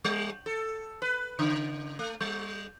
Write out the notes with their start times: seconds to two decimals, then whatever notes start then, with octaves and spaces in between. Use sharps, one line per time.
0.05 G3
0.46 A4
1.02 B4
1.39 C#3
1.99 A3
2.21 G3